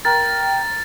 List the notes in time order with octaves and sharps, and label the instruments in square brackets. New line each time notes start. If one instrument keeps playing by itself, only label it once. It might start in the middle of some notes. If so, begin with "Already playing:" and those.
[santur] A#4 [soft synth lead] G5 [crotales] A6